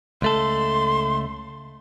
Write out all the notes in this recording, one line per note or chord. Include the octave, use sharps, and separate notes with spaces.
C#2 A3 A4 C6